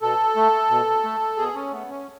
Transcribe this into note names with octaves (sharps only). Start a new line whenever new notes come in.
B2 A4
A3
B2
A3
B2 G#4
C#4
A3 B3
C#4